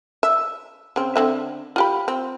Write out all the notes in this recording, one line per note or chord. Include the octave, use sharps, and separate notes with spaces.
E5
C#3 C4
D3 C4 E5
F4 G4 B5
C4